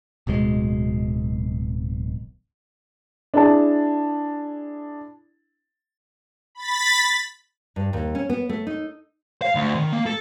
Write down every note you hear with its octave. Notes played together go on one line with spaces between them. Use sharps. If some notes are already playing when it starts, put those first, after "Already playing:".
D1 B1 B2 G#3
D4 E4 G#4 A5
B5 A6 B6
G2
D#2
C#4
B3
A3
D#4
F5
D2
D#3
A#3
A4